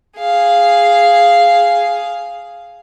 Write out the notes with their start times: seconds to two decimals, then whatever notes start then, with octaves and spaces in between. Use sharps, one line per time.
0.17 G#4 F5